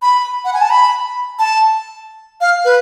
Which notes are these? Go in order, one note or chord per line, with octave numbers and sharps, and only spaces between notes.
B5
F#5
G#5
A5
B5
A5
F5
B4